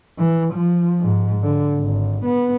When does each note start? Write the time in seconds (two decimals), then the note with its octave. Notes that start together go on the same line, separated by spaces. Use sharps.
0.19 E3
0.54 F3
1.01 G#2
1.43 D3
1.77 G#1
2.25 B3